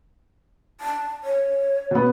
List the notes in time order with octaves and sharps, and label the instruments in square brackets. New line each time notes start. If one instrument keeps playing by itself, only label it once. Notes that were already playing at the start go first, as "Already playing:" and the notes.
[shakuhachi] A5
C#5
[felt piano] B2 B3